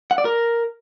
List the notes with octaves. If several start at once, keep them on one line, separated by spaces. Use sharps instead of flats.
F#5
D5
A#4